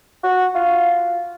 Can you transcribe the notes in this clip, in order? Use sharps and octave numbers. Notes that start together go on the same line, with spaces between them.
F#4
F4